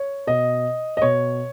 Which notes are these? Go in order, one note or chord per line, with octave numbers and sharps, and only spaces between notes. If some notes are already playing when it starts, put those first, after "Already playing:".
Already playing: C#5
B2 D#5
D#5
B2 C#5